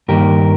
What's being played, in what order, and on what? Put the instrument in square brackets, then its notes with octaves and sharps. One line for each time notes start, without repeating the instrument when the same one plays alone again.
[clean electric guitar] G2 D#3 A#3 G4 A#4